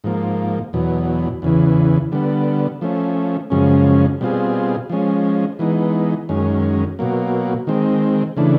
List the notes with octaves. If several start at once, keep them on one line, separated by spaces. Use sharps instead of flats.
G#2 F3 A#3
E2 B2 F#3
E2 C#3 E3
D3 G3 B3
F3 A3 C#4
F#2 C#3 F3 G#3 C#4
B2 G3 C4 F4 G#4
F3 G#3 C#4
E3 G#3 B3 D#4
F#2 D#3 G#3 C#4
B2 F#3 A#3
D#3 G#3 C4
C#3 E3 A3 D4